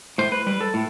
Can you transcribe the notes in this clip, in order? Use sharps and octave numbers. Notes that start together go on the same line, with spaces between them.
A2 C5
B4
G3 B4
A4
A2